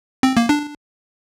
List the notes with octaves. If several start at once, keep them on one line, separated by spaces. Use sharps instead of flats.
C4
A#3
D4